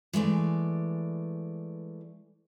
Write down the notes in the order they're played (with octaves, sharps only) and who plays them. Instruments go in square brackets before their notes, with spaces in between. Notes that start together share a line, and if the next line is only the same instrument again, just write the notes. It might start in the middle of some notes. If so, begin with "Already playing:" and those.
[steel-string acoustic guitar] E3 G#3 A3 D5